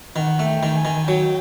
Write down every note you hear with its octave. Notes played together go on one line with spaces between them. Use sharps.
D#3 F#5
A3
G5
D#3
G#5
D#3
F#3 G5